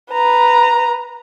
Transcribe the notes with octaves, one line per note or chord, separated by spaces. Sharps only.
B4 A#5